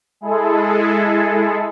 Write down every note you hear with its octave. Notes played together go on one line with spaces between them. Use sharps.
G#3 E4 G#4 A4